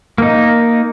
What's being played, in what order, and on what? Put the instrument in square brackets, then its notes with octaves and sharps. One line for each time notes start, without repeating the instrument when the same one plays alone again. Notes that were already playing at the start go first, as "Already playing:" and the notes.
[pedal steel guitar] A#3 D#4